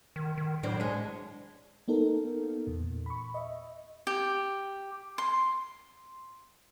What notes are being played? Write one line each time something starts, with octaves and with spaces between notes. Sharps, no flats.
D#3
D#3
A2 F#3 D4 C5
G#3 D4 C#5
A#3 B3 D#4 A4 A#4
E2 A#2
B5 C#6
D#5 E5
G4
C6